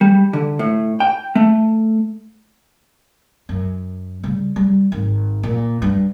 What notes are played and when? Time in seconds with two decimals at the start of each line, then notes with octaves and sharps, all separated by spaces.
0.01 G3
0.33 D3
0.59 A2
1.00 G5
1.35 A3
3.49 F#2
4.23 C#3 G3
4.56 G3
4.92 G#1
5.43 A#2
5.82 G2